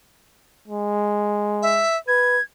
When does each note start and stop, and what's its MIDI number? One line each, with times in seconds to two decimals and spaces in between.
0.68 1.86 56
1.62 1.97 76
2.08 2.38 71
2.08 2.42 92